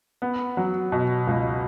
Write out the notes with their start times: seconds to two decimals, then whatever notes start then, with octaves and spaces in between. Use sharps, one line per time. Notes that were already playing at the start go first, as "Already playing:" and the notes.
0.22 B3
0.57 F#3
0.92 B2
1.27 C#2